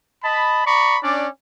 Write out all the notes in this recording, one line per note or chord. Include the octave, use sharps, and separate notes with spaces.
D#5 A5 B5
D5 A#5 B5 C#6
C#4 D4 D5